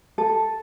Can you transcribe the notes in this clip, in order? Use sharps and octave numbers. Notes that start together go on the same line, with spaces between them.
A4